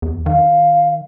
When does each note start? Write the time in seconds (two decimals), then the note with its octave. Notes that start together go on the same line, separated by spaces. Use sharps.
0.02 E2
0.26 D#3 F5